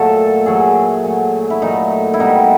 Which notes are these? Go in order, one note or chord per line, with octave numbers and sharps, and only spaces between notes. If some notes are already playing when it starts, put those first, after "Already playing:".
Already playing: A#2 F#3 A3 A4
A#2 F#3 A3 G#4
A#2 F#3 A3
E4
A#2 F#3 A3 D#4
E4
B2 G3 D#4